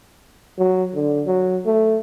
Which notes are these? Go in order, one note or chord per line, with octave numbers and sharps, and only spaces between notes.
F#3
D3
F#3
A3